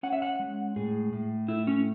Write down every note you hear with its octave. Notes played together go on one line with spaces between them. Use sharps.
C#4 F#5
E5
F#5
G#3
A2 G#4
A2
A3 E4
C#4